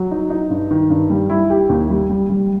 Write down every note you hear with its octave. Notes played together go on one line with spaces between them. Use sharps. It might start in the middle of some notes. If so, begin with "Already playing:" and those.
Already playing: F#3
D#4
D#4
G2
D#3
G2
G3
E4
G4
D#2
G3
G3
G3